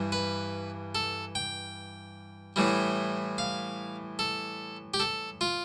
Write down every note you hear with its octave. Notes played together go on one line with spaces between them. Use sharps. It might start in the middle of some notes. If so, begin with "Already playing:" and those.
Already playing: G2 E3 G3
B4
A4
G5
A2 E3 G3
F5
A4
G4
A4
F4